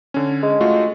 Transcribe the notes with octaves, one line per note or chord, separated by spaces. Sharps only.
D3 C#4
G#3
A3 F4 F#4